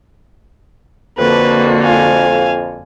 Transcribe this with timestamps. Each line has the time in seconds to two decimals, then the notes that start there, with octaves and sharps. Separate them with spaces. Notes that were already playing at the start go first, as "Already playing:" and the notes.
1.18 F2 D3 A#3 F#4 B4
1.84 F5 G#5